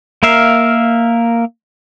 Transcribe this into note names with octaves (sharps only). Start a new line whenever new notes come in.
A#3 A#4 E5 F5